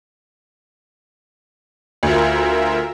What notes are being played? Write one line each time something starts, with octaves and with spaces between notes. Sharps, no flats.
D2 F4 A#4 E5